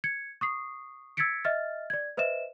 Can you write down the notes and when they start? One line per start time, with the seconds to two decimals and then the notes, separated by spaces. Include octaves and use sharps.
0.04 G#6 C#7
0.41 C#6 D#6 C7
1.17 E6 G#6 A6 B6 C#7 D7
1.45 D#5 E5 F6 A6
1.90 D5 G#6
2.17 B4 C5 D#5 E5 E7